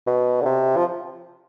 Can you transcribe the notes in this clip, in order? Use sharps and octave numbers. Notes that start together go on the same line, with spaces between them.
B2
D3
C3
F3